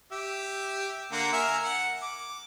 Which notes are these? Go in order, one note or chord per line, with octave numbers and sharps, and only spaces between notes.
G4 E5
D3 A#3 F#5
A#4 E5 G#5
F#5
D6